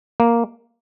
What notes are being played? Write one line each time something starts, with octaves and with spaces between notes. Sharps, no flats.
A#3